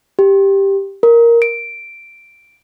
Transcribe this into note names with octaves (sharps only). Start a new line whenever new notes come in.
G4
A#4
D7